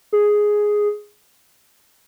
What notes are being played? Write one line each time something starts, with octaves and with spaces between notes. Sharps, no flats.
G#4